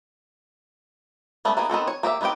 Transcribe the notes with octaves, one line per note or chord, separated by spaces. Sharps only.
G3 A3 B3 C#4
A#3 B3 D#4 G#4
D#3 B3 C4 A4
C#5
A#3 G4 D#5 E5
D#3 B3 C4 G4 G5